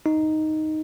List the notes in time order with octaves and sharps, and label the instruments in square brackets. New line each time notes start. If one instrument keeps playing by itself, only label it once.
[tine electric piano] D#4